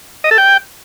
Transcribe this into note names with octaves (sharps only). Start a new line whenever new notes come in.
D#5
A4
G5